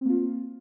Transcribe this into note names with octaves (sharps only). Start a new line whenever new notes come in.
A#3 C4 F4